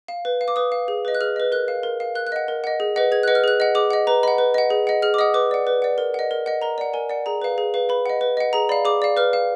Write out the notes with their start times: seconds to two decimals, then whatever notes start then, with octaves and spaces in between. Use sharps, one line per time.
0.08 F5
0.25 B4
0.41 F5
0.48 D6
0.56 B4 D#6
0.72 F5
0.88 G#4
1.05 B4 D#5
1.15 F#6
1.21 G#4 F6
1.36 B4 D#5
1.52 A#4 F#6
1.68 F5
1.83 A#4
2.00 F5
2.15 A#4 F#6
2.27 F#6
2.32 D#5 F#5
2.48 A#4
2.64 D#5 F#5
2.80 G#4
2.96 B4 D#5 F#5
3.12 G#4 G#6
3.23 B4 D#5 F#5 F#6
3.35 F6
3.44 G#4 F#6
3.60 D#5 F#5
3.75 G#4 D6
3.91 D#5 F#5
4.07 B4 A#5
4.23 D#5 F#5 B5
4.38 B4
4.54 D#5 F#5
4.70 G#4
4.87 D#5 F#5
5.02 G#4 F6
5.14 D6
5.19 D#5 F#5 D#6
5.34 B4 D6
5.51 D5 F#5
5.67 B4
5.82 D5 F#5
5.98 A#4
6.14 D#5 F#5
6.31 A#4
6.46 D#5 F#5
6.62 A#4 A#5
6.78 D5 F#5
6.93 A#4 G#5
7.09 D5 F#5
7.26 G#4 A#5
7.42 B4 F5
7.58 G#4
7.74 B4 F5
7.89 B4 B5
8.06 D#5 F#5
8.21 B4
8.37 D#5 F#5
8.53 G#4 A#5
8.69 D5 F5 B5
8.85 G#4 D6
9.02 D5 F5
9.17 B4 F6
9.33 F5